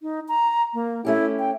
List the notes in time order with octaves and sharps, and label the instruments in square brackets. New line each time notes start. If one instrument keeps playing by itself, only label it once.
[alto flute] D#4
A#5
A#3
[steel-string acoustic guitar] A3 C#4 G4 [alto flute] E4
[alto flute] G5